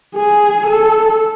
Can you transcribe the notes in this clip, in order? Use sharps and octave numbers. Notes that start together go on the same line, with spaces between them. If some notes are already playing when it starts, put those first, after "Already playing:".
G#4
A4